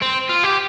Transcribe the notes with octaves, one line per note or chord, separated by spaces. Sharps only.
C4
F4
G4